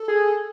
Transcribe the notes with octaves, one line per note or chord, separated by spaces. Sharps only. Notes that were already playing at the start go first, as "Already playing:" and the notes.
Already playing: A4
G#4